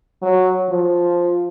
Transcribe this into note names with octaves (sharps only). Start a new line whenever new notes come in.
F#3
F3